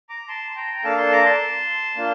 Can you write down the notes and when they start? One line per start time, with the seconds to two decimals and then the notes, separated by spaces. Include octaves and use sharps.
0.09 A#5 D6
0.28 A5 C6
0.51 C6
0.56 G5 A#5
0.79 A#5
0.84 A#3 D4 A4 F5 A5
0.98 A5 C6
1.12 A#5 D6
1.26 A5 C6
1.96 A#3 D4 F4